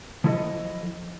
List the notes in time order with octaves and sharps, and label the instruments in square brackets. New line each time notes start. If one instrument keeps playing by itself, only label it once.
[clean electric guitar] F3 F#3 E4 A4 D#5